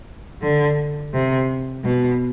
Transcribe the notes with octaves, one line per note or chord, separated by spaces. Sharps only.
D3
C3
B2